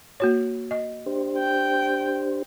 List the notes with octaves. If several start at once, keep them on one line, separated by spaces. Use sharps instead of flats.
A#3 F#4 C#5
D#5
D4 G4 C5
G5